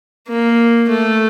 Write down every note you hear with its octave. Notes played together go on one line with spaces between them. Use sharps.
A#3
A3